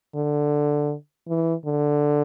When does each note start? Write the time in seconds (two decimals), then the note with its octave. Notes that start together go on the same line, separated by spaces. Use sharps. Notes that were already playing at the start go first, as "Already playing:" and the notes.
0.16 D3
1.28 E3
1.65 D3